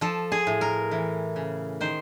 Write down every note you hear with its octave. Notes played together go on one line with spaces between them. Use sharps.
F3 A4
G#4
A2
A#4
E3
C#3
D#3 C5